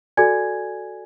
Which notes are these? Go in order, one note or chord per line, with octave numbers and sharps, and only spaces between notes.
F#4 A4 D5 G#5 G#6